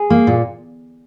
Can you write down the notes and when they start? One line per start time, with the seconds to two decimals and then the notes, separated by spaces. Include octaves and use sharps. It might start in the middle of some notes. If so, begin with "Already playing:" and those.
Already playing: G#4
0.10 A#3
0.27 A#2